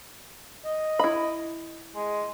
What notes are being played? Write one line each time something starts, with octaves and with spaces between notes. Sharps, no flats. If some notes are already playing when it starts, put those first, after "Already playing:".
D#5
E4 B5
G#3